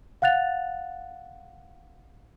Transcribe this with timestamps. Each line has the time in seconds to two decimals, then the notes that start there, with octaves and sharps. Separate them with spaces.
0.22 F5 F#5 F#6 A6 F7